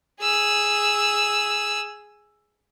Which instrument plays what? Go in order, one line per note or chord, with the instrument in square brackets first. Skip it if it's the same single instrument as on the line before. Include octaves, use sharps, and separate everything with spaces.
[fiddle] G#4 E6